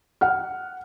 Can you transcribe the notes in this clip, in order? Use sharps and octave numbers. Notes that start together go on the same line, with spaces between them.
F#5 F6